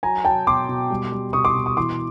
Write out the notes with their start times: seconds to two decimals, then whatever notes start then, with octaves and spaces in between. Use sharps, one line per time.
0.03 F#3 G#5 A#5
0.25 F#3 G5 A5
0.47 B2 C6 D6
0.69 B2
0.90 G3
1.12 G3
1.33 B2 C#6 D#6
1.45 C6 D6
1.55 B2
1.66 C#6 D#6
1.77 E3 C6 D6